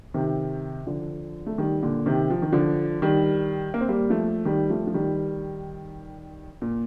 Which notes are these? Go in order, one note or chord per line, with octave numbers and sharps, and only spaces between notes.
C3 D#3
D3 F3
A3
D#3 G3
A#2 D3
C3 D#3
F3
D#3
D3 F3
D#3 G3
A#3
C4
G3 A#3
F3 A3
D#3 G3
F3 A3
F3
D#3 G3
A#2